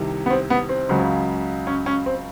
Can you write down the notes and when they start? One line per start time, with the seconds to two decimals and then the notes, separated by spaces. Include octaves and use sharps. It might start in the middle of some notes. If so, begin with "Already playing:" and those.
Already playing: C2 C3 D#3
0.26 B3
0.30 C4
0.50 B3
0.69 C4
0.89 C#2 C#3 F#3
1.67 C#4
1.86 C#4
2.06 C4